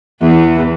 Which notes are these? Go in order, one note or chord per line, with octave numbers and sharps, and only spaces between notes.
E2 E3